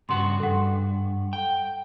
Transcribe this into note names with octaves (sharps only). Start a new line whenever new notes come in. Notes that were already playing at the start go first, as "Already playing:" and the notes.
G2 C#3 F#4 C6
E2 G2 A4 F#5
G5